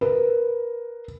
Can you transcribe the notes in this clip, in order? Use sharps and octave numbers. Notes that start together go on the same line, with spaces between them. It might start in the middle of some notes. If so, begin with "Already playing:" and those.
A#4 B4